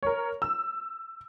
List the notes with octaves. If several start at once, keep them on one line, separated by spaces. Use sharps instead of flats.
A#4 C#5
E6